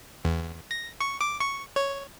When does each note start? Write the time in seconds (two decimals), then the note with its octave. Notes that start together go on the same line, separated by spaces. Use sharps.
0.25 E2
0.71 A#6
1.01 C#6
1.21 D6
1.40 C#6
1.76 C#5